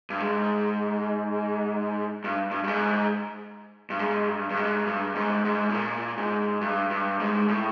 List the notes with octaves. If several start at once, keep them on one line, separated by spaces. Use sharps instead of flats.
G2
G#2
G2
G2
G2
G#2
G2
G#2
G2
G2
G#2
G2
G#2
G#2
A2
A#2
G#2
G2
G2
G#2
A2